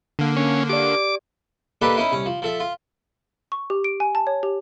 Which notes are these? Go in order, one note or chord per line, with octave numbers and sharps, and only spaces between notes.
D3 A#3
C#4
G4 D5 D6
A#3 D4 D#4 G4 A4 B4
C#4 D#4 E4
C2 C#4
F3
F3 A4 E5
F4
C#6
G4
D7
G#5
A5
C#5
G4